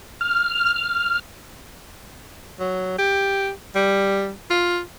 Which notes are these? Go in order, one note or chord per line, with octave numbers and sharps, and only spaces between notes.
F6
F#3
G4
G3
F4